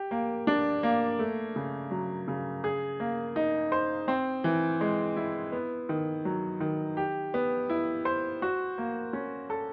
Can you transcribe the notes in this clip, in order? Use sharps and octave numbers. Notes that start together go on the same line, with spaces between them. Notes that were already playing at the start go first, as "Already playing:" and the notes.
Already playing: G4
A#3
D4
A#3
A3
C#3
F#3
C#3
G#4
A#3
D#4
C5
C4
E3
G#3
E4
B3
D#3
F#3
D#3
G4
B3
E4
C5
F#4
A#3
C#4
A4